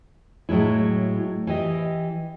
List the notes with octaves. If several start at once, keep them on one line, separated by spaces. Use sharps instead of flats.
A2 F#3 G#3 E4
E3 G4 D#5